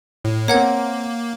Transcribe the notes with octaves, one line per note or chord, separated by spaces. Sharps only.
A2
A#3 C4 A#4 C#5 F#5 G#6